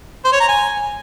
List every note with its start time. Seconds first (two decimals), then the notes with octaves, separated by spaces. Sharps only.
0.24 C5
0.32 C#5
0.40 A#5
0.48 G#5